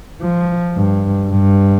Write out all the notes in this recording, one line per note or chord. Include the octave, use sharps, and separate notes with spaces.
F3
G2
G2